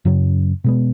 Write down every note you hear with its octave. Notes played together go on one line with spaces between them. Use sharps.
F#2 C#3 F#3 C#4
B2 G#3 B3